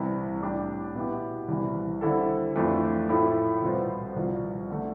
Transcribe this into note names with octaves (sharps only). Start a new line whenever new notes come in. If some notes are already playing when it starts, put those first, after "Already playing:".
Already playing: C2 C3 E3
A2 G3 D4 G4
B2 B3 E4 G4
C2 C3 E3
D3 G3 C4 E4 A4
F2 E3 A3 D4 F4
A2 F3 A3 E4 A4
C2 B2 B3 F4 C5
C2 C3 F3
D3 A3